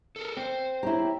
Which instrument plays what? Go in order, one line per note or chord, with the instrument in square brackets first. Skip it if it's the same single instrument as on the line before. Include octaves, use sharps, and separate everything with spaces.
[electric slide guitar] A4 A#4
[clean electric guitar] C4 [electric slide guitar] C5
[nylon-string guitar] E4 G4 [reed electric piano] C#5 G5 A#5